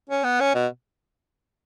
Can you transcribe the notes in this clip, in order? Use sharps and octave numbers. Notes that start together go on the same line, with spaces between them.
C#4
B3
C#4
B2